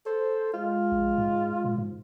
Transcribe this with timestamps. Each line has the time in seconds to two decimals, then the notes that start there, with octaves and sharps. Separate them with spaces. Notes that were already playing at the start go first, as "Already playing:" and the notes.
0.06 A4 C5
0.54 G#3 F4
0.92 A#1
1.18 G#2
1.64 A#2
1.78 G#2